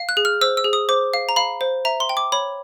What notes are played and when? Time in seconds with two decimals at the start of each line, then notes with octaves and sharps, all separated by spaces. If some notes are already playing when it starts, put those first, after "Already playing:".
Already playing: F5
0.09 F#6
0.17 G#4
0.25 F6
0.41 C5 E6
0.57 E6
0.64 G#4
0.73 D#6
0.89 C5 D6
1.14 F5
1.29 A#5
1.36 F5 B5
1.61 C5
1.85 E5 A#5
2.00 C6
2.09 G5
2.17 D6
2.32 C#5 B5